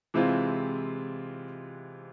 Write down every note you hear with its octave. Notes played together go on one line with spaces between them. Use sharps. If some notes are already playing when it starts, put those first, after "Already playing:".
C3 E3 G#3 C4 F4